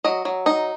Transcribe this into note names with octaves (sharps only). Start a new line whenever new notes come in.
F#3 D#5
F#3
D#4